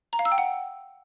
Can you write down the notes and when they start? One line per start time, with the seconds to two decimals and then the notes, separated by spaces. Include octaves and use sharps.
0.13 A#5
0.19 F5
0.25 E6
0.32 G5
0.38 F#5